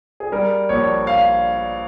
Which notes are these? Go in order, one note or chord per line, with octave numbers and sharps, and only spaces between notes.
G#4
G3 A#4
A#1 C#5
F5